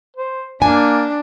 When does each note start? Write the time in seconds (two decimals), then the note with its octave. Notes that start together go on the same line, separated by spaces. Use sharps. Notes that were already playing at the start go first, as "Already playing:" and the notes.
0.17 C5
0.62 A#3 D4 G#5